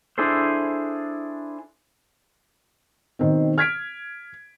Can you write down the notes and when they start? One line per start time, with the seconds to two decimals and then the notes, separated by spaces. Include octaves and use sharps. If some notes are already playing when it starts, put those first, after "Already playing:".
0.18 D4 E4 G#4 A4 C5
3.19 B2 D#3 C4
3.58 F6 G#6 B6 D7